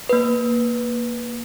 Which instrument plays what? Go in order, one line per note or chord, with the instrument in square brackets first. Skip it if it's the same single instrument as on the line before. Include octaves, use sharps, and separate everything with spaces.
[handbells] A#3 B4